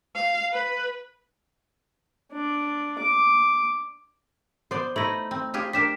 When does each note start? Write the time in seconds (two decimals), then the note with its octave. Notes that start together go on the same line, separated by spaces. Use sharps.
0.15 F5
0.53 B4
2.33 D4
2.99 D6
4.71 B3 C5 D5
4.96 A3 D#4 E4 D#5 B5 A#6
5.31 C4
5.54 F4 G4 G#4
5.73 D4 G4 A#4 B6 E7